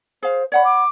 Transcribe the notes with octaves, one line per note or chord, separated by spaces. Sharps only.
G#4 C5 F5
C#5 D5 F#5 B5
D6